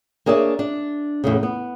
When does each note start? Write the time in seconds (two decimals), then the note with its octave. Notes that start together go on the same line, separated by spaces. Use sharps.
0.26 A#3 D4 G#4 C#5 E5
0.59 D4
1.24 E2 A2 C#3
1.43 B3